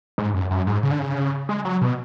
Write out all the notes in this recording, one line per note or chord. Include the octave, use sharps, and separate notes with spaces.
G#2
F#2
F#2
G#2
C#3
D3
C#3
G#3
F#3
B2